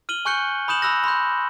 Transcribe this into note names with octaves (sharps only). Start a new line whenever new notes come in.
F6 D#7 F#7 G7
G#5 C#6 F#6 G6 C#7 G7
B5 D#6 G6 E7 F#7
B5 E6 F#6 A#6
B5 C6 G6